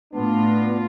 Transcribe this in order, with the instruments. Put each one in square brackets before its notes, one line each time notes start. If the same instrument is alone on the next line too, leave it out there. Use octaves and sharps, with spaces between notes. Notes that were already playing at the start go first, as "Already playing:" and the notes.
[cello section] A2 F4 [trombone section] B3 D4